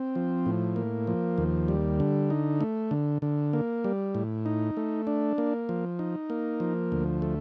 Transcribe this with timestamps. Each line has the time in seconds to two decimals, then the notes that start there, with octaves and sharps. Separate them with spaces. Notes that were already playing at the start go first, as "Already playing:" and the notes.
Already playing: C4
0.15 F3
0.46 A2
0.76 A#3
1.07 F3
1.38 D#2
1.68 G3
2.00 D3
2.30 D#4
2.61 A3
2.91 D3
3.22 D3
3.53 A#3
3.84 G3
4.15 A2
4.46 D#4
4.77 A3
5.07 D4
5.38 A#3
5.69 F3
5.99 D#4
6.30 A#3
6.60 F3
6.92 D2
7.22 A3